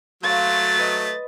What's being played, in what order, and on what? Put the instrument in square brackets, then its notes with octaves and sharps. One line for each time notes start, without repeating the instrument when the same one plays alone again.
[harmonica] F#3 A3 [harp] C#5 F5 C6 [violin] A6
[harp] B4 D#5